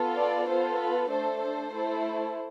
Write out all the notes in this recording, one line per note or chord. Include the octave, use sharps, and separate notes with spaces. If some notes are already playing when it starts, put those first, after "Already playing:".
Already playing: B3 F4 A4
D5
B3 F4 A4 C5
B4
A3 D4 A4 C5
C5
A3 E4 A4